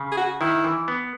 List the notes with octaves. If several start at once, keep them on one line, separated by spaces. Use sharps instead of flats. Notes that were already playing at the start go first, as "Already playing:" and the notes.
Already playing: C#3
G#4
F#4
D#3 E4
E3
B3